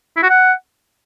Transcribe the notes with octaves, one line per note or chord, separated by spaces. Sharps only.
E4
F#4
F#5